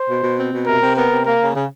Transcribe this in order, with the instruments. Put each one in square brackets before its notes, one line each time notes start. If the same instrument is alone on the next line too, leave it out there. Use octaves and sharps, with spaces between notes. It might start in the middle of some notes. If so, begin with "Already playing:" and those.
Already playing: [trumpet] C5
[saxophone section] B2
B2
C4
B2
[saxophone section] C3 [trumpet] A#4
[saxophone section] C3
[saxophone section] B3 [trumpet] A#4
[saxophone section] C3
[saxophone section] A#3 [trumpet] A#4
[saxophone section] C#3
C#3